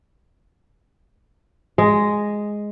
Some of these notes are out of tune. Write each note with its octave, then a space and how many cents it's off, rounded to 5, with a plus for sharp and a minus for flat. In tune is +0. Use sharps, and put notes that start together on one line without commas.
G#3 +0 D#5 +0